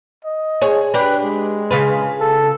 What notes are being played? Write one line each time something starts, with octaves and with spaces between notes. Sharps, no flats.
D#5
G#4 C#5
D4 G4 B4
G#3
C#3 F4 B4
A4